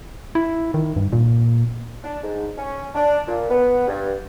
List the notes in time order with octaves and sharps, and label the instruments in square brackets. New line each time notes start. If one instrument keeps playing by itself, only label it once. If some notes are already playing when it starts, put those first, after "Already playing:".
[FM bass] E4
D#3
G2
A#2
[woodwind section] D4
G#2
C#4
D4
A#2
B3
G2